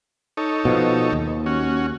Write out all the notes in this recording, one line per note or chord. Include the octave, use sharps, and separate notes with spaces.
D#4 A4 C#5
B2 F3
D#2
C#4 F#4